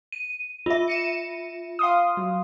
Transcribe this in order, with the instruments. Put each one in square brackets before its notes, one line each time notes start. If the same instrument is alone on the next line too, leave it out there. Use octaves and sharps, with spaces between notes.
[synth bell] D#7
F4 E5
[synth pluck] C#7 D#7 E7
F5 C6 D#6
F#3